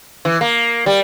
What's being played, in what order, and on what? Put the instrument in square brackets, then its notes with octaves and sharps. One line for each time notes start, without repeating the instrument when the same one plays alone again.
[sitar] E3
A#3
G3